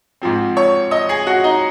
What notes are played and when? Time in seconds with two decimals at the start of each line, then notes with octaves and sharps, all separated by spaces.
0.22 G#2 F3 C4
0.57 C#5 C#6
0.91 D#5 D#6
1.09 G#4 G#5
1.26 F#4 F#5
1.44 D#4 D#5